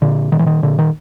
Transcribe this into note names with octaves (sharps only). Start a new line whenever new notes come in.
A#2 D3
A#2 D#3
E3
D#3
A#2 D3
D#3